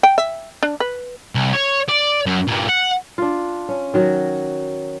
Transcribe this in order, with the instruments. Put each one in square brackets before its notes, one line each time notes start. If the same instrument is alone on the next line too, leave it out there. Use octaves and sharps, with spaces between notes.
[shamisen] G5
E5
D4
B4
[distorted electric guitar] C2
C#5
D5
F#2
G2 A#2
F#5
[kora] D4 F4
C#4
D#3 F#3 F#4